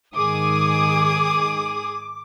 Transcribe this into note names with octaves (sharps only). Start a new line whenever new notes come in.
G#2 D#3 G#4 D6 D#6